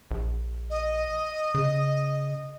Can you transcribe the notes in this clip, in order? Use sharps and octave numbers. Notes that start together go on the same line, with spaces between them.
A#1
D#5
C#3